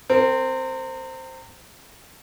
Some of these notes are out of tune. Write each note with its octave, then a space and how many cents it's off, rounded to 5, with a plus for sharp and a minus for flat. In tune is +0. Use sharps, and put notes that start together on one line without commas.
C4 +0 A#4 -30